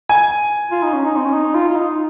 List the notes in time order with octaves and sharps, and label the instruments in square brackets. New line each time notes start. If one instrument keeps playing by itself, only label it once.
[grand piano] G#5
[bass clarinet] F4
D#4
C#4
D#4
C4
C#4
D#4
F4
F4
D#4